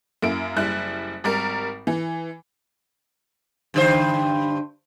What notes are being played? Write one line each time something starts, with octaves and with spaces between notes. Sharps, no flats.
F#2 A#3 E4 D7
F#1 G3 E4 F#6
G#1 G3 A#4
E3
G2 D3 C5